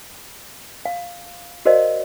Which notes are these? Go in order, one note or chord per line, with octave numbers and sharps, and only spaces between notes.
F5
F#4 A#4 C5 D5 D#5 F5